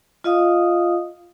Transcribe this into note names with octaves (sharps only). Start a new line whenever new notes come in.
F4 D#5 F5 D#6